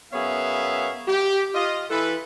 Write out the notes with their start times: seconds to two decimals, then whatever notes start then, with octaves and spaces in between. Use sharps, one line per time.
0.13 F#2 B3 G#4 C#5 E5 F5
1.08 G4
1.55 F4 D#5
1.90 E3 A4 B4